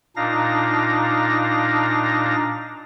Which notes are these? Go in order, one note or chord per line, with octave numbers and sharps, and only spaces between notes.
A#2 D4 D#4 F5 A#6